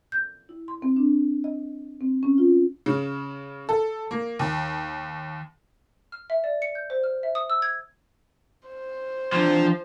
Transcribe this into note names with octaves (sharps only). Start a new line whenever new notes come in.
G6
E4
C6
C4
D4
D#5
C4
C#4
F4
C#3
A4
A#3
D#2
F6
E5
D5
C#7
G6
C5
F6
E5
D#6
E6
G#6
C5
E3 F3 D4 C6